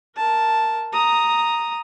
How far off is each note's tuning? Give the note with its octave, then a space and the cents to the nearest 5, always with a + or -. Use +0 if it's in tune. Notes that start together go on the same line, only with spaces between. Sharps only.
A#4 +0 A5 +0
A#5 +0 D#6 +0